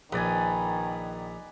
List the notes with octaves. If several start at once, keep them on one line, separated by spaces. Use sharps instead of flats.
A#1 D#3 B4 D5 G#5